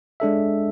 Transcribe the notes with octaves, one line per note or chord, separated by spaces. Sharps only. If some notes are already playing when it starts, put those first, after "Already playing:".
G#3 D4 A4 E5